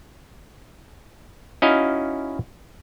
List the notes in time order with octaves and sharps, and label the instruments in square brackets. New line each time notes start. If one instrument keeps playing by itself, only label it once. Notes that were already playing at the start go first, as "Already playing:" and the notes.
[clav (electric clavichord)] C#4 D#4 E4 F#4 D#5 F5